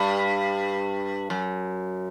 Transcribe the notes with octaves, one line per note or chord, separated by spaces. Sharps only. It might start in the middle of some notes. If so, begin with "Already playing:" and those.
Already playing: G2
F#2